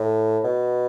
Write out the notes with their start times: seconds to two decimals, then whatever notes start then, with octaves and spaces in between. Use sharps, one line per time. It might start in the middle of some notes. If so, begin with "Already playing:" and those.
Already playing: A2
0.44 B2